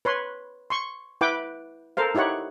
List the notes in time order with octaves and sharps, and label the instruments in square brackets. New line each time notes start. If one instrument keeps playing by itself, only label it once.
[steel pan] B4 C#5 C6
C6 C#6
E4 B4 F#5 G5 D6
A4 A#4 C5 F5
D#4 E4 G4 C#5 F#5